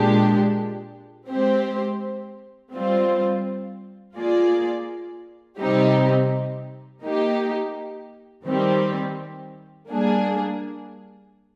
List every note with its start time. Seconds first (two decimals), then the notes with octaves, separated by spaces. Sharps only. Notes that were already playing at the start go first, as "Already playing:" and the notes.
Already playing: A#2 G#3 D4 G4
1.29 G#3 C4 G4 C5
2.73 G3 C4 F4 C5
4.16 A#3 F4 G#4 D5
5.59 C3 G3 C4 D#4 G4
7.03 A#3 D#4 G4
8.45 D#3 G3 C4 G4
9.90 G3 A#3 D4 G#4